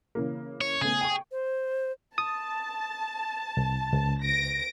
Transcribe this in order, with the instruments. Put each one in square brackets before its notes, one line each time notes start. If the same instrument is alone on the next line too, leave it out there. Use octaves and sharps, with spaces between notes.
[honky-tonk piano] C#3 E3 A#3
[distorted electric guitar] C#5
[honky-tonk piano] C#3 A3 B3 [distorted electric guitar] G#4
[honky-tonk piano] G5 C#6
[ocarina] C5
[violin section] A5 [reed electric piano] D#6
[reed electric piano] C2
C#2
[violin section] A#6 D7